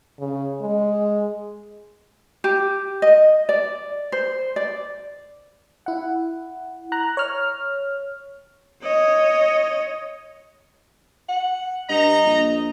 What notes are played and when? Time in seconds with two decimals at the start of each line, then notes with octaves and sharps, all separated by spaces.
0.20 C#3
0.61 G#3
2.44 G4
3.02 D#5
3.49 D5
4.12 C5
4.56 D5
5.86 E4 F#5
6.92 A#5 F#6
7.17 C#5 F6
8.83 C#5 D#5
11.29 F#5
11.89 G2 D#4 D#5 A#5
12.25 A#1